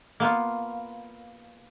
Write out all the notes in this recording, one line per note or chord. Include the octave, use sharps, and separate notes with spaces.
A#3 B3 F4